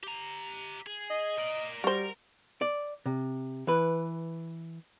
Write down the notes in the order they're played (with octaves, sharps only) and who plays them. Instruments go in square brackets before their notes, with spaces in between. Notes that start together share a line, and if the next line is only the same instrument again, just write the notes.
[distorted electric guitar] G4 A#5
G#4
[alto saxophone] D#5
[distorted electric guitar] A#4 D5
[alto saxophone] G3 [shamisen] F#4 C5 [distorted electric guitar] A#4
[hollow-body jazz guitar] D5
C3
E3 B4